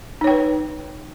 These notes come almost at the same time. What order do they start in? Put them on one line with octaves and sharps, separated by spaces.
D#4 C#5 G5 B4